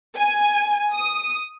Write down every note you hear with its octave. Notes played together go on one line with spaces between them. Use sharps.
G#5
D#6